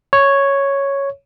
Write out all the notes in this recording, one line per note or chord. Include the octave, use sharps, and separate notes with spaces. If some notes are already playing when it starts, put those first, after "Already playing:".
C#5